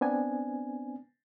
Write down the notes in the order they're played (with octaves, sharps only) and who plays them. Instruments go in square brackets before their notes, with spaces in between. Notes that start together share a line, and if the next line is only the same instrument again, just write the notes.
[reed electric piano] B3 C4 D4 G#5